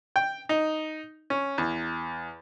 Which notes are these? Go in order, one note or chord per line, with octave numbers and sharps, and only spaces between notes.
G5
D#4
C#4
E2